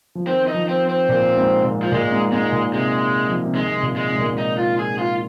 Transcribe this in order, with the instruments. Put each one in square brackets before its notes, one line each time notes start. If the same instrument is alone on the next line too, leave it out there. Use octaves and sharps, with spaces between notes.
[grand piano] F3
[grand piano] D#3 [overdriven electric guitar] C4
[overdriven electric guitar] D#4
[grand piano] F3
[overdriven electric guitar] C4
C4
[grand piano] A#2
G#2
A#2
[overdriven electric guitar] F3
[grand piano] A#2 [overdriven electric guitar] G#3
[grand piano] G#2
[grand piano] G#2 [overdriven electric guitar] G#3
[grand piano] A#2
[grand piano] C3 [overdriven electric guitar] G#3
[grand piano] F3
C3
[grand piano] D#3 [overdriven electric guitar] G#3
[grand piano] C3
A#2
[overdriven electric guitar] G#3
[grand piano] G#2
A#2
G#2
[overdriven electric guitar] D#4
F4
G#4
F4